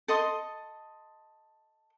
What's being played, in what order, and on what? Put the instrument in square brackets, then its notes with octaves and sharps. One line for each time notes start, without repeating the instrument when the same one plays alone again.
[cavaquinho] A4 D#5 C6 D#6